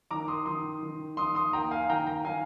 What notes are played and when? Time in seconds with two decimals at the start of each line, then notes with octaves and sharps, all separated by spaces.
0.11 D#3 A#5 D6
0.28 C6 D#6
0.46 D#3 C6 D#6
0.83 D#3
1.17 D#3 C6 D#6
1.35 C6 D#6
1.53 D#2 G5 A#5
1.71 F5 G#5
1.89 D#3 G5 A#5
2.07 G5 A#5
2.24 D#3 F5 G#5